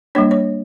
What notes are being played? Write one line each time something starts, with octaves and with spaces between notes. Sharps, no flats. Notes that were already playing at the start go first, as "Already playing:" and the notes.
G3 A#3 D4 C#5
C#5